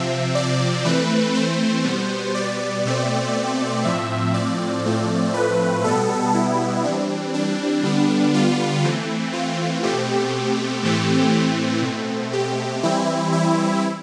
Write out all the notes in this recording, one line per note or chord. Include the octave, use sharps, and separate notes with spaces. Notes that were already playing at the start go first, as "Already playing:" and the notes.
Already playing: C3 F3 C4 E5
D5
E3 A3 C4 B4
C5
B2 G3 B3
D5
B2 A3 C4
A2 F3 C4 E5
D5
A2 F3 A3 C4
B4
B2 G3 B3 A4
E4
E3 G3 C4 D4
D4
D3 G3 B3
F4
E3 A3 C4
F4
B2 A3 C4 G4
A2 E3 A3 C4
B2 A3 C4
G4
E3 G3 C4 E4
E4